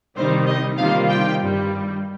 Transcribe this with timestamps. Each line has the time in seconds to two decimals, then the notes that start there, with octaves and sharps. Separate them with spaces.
0.17 C3 D#3 G3 C4 D#4 C5
0.47 D#5
0.78 C3 D#3 G3 A#3 F4 F5
1.09 G5
1.40 G2 D#3 G3